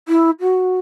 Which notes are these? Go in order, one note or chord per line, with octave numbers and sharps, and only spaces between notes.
E4
F#4